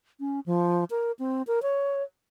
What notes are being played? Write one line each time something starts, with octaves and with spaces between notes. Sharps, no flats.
C#4
F3
A#4
C4
A#4
C#5